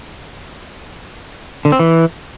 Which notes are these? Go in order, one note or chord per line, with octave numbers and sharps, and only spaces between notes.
D3
C4
E3